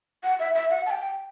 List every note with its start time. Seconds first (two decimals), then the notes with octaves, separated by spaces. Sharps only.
0.24 F#5
0.39 E5
0.55 E5
0.70 F#5
0.86 A5
0.91 G5